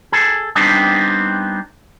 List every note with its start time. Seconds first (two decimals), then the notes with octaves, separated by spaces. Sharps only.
0.12 G#4 A4
0.56 G3 B3 C4 D4 D#4